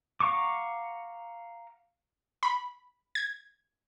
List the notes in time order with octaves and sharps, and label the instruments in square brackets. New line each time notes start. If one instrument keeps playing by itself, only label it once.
[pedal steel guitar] F5 F#5 A#5 C#6 D6
[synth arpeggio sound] B5
G#6